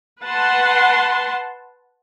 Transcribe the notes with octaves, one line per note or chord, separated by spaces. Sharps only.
B4 F#5 A5 C6